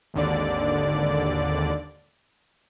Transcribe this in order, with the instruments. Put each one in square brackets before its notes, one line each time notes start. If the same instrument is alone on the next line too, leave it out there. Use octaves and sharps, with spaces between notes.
[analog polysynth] G#1 D#2 D3 D5